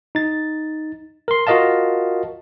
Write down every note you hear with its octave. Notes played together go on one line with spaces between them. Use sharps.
D#4 A6
A#4 C6
F4 F#4 A#4 D#5 F5 A5